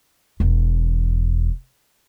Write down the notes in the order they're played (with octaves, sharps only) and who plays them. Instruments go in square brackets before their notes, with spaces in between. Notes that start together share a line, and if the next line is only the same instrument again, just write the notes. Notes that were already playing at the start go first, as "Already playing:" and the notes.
[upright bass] E1 E2